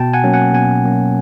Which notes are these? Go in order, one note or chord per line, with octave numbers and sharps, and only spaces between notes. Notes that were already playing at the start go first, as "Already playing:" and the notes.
Already playing: B2 G5 A5
F#5 G#5
F#3 A#3 C#4
F#5 G#5
B2 F#5 G#5
F#3 A#3 C#4